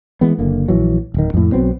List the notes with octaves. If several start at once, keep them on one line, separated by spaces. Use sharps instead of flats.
E3 G#3 B3
F#1 D3 A#3
A#1 E3 F#3
D1 D#3
F2 A2
B1 F#3 B3 C4